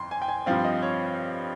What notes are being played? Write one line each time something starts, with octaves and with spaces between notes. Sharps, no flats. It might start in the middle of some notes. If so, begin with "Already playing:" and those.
Already playing: G1 F2 C6
G#5
G5
G#5
G2 F3 C4 F5
D#5
C#5